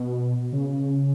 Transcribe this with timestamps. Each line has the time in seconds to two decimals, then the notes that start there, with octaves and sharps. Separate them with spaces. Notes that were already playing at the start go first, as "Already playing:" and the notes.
Already playing: B2
0.53 C#3